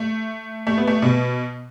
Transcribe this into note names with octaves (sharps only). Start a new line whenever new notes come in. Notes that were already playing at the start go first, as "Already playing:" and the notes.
Already playing: A3
A3
B3
A3
B2 B3